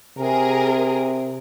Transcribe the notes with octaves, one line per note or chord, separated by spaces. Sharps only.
C3 G#4 A#4